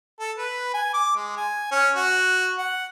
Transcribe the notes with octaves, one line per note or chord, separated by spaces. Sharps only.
A4
B4
G#5
D6
G#3
G#5
C#4
F#4
F#5